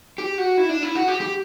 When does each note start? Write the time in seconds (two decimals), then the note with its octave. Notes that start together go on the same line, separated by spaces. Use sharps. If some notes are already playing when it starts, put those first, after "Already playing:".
0.18 G4
0.38 F#4
0.57 E4
0.69 D4
0.83 E4
0.95 F#4
1.08 G4
1.21 G4